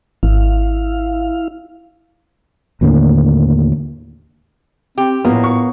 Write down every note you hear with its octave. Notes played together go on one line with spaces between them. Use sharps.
G#1 E4 F5
D#2 A2 D3 A#3
C4 G4
A#1 A2 A#3 B3
C#6